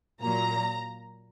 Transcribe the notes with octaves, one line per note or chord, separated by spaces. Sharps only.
A#2 F#3 A#3 A#5